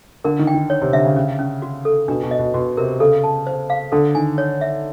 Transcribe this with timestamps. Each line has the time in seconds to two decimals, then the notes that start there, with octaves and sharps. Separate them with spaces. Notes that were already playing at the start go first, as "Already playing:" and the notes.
0.24 D3 A#4
0.39 D#3
0.47 G5
0.54 D#3
0.70 C#5
0.82 C3
0.93 D3 E5
1.05 C#3
1.16 C#4
1.39 C#4
1.62 F#4
1.85 A4
2.08 B2 D4
2.23 B2
2.31 D#5
2.39 B2
2.54 B2 F#4
2.77 C3 A#4
3.00 C#3 A4
3.24 A5
3.47 C5
3.70 F5
3.92 D3 A4
4.15 D#3 G#5
4.38 C#5
4.61 E5